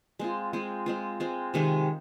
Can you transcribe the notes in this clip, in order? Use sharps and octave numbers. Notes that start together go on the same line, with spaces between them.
G#3 C4 F4
G#3 C4 F4
G#3 C4 F4
G#3 C4 F4
C3 D#3 G#3